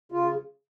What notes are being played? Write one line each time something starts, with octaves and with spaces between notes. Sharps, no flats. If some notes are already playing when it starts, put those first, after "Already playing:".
C#3 F4